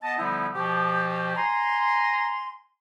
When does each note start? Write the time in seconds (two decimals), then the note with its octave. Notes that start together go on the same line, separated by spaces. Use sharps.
0.02 B3 D#5 A5
0.18 D3 F3 G3 B3 D#4 E4
0.54 B2 F3 G4
1.36 G#5 A#5 C6